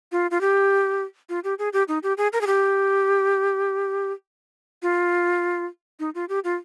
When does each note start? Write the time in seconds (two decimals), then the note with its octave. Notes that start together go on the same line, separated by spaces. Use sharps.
0.12 F4
0.31 F4
0.41 G4
1.29 F4
1.44 G4
1.59 G#4
1.73 G4
1.88 D#4
2.03 G4
2.17 G#4
2.33 A#4
2.41 G#4
2.47 G4
4.82 F4
6.00 D#4
6.15 F4
6.29 G4
6.44 F4